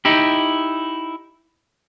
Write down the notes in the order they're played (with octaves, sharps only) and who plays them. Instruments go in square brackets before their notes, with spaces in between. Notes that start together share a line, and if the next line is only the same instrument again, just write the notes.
[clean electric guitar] D#4 E4 G4